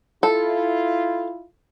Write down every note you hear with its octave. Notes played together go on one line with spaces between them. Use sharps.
E4 F4 A4